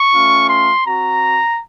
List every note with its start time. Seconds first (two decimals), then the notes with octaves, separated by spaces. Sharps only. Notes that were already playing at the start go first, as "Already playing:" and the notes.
Already playing: C#6
0.14 A3 C#4 F4
0.49 C6
0.85 C4 F#4 A#5